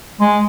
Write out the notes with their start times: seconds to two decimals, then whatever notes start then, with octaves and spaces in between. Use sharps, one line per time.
0.20 G#3